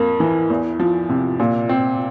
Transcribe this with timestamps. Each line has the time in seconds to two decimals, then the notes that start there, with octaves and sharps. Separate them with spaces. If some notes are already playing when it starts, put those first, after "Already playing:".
Already playing: F2 A#3
0.20 E3
0.50 E2
0.80 F3
1.10 C3
1.40 A#2
1.69 C4